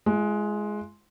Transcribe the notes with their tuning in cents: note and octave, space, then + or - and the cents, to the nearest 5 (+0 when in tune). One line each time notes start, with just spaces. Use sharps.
G#3 +10 F4 -40